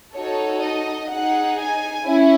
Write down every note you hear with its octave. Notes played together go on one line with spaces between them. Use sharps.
D#4 F#4 A4 C#5
D#5
D#4 G#4 F#5
G#5
C#4 E4